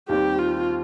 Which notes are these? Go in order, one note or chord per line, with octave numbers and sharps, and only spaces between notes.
D#2 D#3 G3 C4 G4
F4